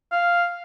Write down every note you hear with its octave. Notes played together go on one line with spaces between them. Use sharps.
F5